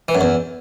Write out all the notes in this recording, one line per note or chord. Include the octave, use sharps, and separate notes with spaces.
E3
F#2
E2